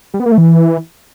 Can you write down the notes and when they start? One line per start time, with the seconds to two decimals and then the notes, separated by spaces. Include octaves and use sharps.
0.14 G3
0.20 B3
0.26 A#3
0.32 A3
0.38 E3